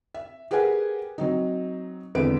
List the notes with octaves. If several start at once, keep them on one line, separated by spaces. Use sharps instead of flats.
E5
G4 G#4 A#4 B4 F#5 G#5
F#3 C4 D#4
G#1 E2 D3 B4 E5 D7